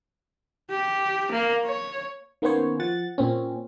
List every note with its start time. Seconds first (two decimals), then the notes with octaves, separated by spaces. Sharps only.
0.71 G4
1.32 A#3
1.64 C#5
2.42 D#3 A#3 B3 C#4 C5 C#5
2.80 F3 F#5 A6
3.18 A#2 C4 C#4